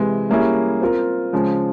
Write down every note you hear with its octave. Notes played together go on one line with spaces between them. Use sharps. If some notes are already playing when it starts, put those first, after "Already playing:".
Already playing: C3 E3 G#3
G3 A#3 C#4 E4 G#4
C4 F4 A#4
C#3 F3 G#3